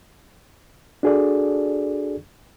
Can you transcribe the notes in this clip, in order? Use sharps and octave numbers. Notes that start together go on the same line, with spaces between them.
D4 F#4 G#4 A4 D5